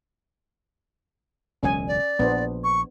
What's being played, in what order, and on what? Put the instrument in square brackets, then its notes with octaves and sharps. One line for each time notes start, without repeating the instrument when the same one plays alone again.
[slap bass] E1 C#2 F#3 [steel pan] C#4 G#5
[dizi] D5
[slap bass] A#1 A#2 [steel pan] B3 D4 C5
[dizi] C#6